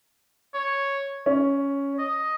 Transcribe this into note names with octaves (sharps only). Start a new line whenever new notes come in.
C#5
C#4
D#5